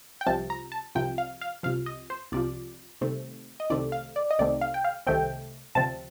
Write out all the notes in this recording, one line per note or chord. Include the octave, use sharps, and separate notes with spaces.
G5
C2 C3 F3 A5
A#5
A5
C2 C3 F3 G5
F5
F5
C2 C3 F3 F5
D#5
C5
C2 C3 F3 D5
C2 C3 D#3 A3 C4
D#5
C2 C3 D#3 A3 C4 D5
F5
D5
D#5
C2 C3 D#3 A3 C4 D5
F5
G5
F5
C2 C3 D#3 A3 C4 G5
D2 C3 F3 C4 A5